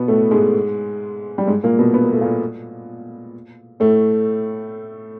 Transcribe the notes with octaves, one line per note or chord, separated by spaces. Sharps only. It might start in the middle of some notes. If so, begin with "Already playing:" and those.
Already playing: B2 B3
A2 A3
G#2 G#3
G3
G#2 G#3
A#2 A#3
B2 B3
B3
A#3
A3
A#2 A#3
A2 A3